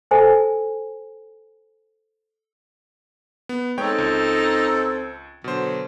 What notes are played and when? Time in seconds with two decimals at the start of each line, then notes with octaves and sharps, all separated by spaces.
0.11 A4 C5 E5 G#5 A5
3.49 B3
3.78 G#3 C4 D#4 A4 C#5 G5
3.98 C#2
5.44 B2 D3 F#3 C5